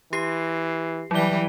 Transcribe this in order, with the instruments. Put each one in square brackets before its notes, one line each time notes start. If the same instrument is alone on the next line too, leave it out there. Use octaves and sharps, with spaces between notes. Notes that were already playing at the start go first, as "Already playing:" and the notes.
[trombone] E3 [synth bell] G4 C7
[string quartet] E3 G3 [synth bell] F#3 G7